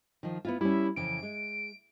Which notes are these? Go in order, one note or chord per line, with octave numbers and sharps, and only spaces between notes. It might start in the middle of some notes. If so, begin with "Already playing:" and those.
D#3 F3
B3 E4 F4
G3 C#4 E4
F2 C#3 E3 D7
G#3